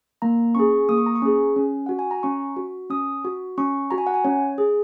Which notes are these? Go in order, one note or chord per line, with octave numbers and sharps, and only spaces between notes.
A#3 A#5
C#4 G#4 C#6
A#3 D#6
C#6
A#5
C#6
C#4 G#4
C#4
F#4 F#5
G#5
A#5
C#4 C#6
F#4
C#4 D#6
F#4
C#4 C#6
F#4 A#5
G#5
F#5
G#5
C#4 C#5
G#4